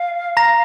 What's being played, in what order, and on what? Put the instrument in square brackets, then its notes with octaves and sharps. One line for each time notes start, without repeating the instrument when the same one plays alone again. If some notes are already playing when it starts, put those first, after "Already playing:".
Already playing: [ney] F5
[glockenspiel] A#5 A#6